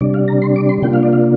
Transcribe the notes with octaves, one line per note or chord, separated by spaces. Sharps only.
C3 G3 D4 D5
F5
A#5
C6
D6
C6
C3 A#3 D4 F4 G5
F5
D5
F5